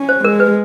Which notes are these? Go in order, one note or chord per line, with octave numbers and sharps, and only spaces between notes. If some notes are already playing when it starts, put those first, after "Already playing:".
Already playing: C#4
C5
G#3 A#4
B4